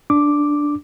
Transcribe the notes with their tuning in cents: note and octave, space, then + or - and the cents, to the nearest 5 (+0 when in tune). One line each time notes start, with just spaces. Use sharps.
D4 +0 D6 +0